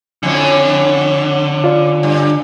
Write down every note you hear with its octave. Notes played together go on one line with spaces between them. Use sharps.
F2 A2 D3 C#4
F4 D5
G2